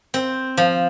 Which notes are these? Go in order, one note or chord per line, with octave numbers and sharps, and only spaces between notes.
C4
F3